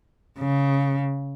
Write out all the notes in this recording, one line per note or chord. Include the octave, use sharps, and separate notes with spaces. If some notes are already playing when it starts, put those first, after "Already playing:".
C#3